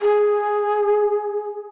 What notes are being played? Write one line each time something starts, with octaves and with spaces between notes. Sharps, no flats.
G#4